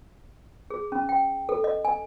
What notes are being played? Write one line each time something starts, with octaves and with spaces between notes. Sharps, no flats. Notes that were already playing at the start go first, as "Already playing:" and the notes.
G#4
C#4
G5
A4
D#5
G#5